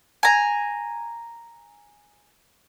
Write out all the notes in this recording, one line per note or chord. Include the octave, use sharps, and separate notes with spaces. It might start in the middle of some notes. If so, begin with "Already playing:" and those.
G#5 A#5